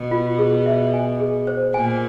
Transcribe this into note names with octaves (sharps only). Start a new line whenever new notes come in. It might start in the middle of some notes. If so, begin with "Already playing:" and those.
Already playing: B2
F4
G#4
E5
G#5
G#4
C5
A#2 G#5